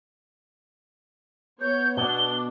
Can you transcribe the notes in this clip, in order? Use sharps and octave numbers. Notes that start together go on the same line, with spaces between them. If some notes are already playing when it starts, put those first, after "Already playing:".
B3 C#5 G6
B2 D4 G7